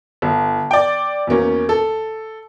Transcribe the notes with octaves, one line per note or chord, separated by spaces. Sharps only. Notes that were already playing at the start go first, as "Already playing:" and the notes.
G1
D5 G5
E2 B2 A#3 C#4
A4